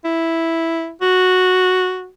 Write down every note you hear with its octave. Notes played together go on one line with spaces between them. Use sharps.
E4
F#4